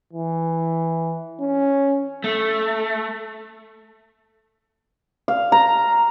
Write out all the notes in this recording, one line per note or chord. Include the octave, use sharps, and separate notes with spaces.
E3
C#4
A3
F5
A#5